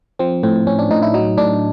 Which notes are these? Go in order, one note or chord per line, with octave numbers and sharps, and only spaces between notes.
F3 C4
A2 C4
A2 C#4
D4
A2 D#4
E4
F#3 D#4
A2 D4